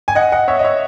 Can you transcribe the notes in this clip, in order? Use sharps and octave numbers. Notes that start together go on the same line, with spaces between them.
G#5
D#5 F#5
D#5 F#5
C#5 E5
D#5
C#5 E5